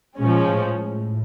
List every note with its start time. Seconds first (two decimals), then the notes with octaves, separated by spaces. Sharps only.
0.19 A#2 F3 G#3 C#4
0.50 A2